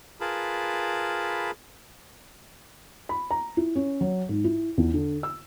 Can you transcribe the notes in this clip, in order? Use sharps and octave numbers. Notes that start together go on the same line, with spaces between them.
F4 G#4 A#4 B4 A5 B5
B5
A#5
E4
C#4
F#3
G#2
E4
E2
D3
E6